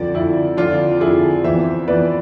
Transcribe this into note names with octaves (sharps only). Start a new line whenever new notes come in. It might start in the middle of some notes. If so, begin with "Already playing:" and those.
Already playing: F2 D3 F3 D5
F2 D3 F3 E4
F2 D3 F3 D4 F4
F2 D3 F3 E4 G#4
F2 E3 B3 C5 E5
F2 E3 B3 B4 D5